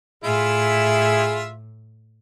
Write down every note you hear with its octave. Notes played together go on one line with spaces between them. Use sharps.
A2 E4 F4 G#4 E5